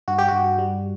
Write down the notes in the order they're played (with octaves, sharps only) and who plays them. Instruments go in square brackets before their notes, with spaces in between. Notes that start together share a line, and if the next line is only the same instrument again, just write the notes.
[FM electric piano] G2 F#4
G4
G2 F#4
G3